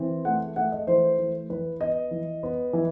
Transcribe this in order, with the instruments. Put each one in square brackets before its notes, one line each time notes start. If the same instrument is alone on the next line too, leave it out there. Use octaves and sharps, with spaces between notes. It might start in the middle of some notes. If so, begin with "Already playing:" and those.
Already playing: [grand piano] E3 C4
A3 F#5
A3 F#5
D#5
E3 C5
E3
E3 B4
B3 D#5
E3
B3
E3